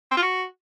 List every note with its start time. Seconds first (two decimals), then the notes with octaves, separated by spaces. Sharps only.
0.12 C4
0.17 F4
0.22 F#4